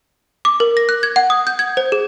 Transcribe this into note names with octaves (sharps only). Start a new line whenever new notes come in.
D6
A#4
A#6
F#6
G#6
F#5
D#6
G6
G#6
C5
G#4